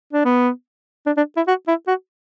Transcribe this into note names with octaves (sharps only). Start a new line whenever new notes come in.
D4
B3
D4
D4
E4
F#4
E4
F#4